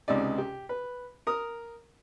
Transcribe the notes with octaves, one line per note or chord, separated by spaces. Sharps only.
C#2 C3 D#4 D5
G4
B4
A#4 D#6